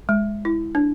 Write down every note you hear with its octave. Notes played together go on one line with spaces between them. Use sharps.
G#3
E4
D4